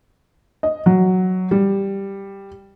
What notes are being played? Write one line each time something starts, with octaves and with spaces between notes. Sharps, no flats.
D#5
F#3
G3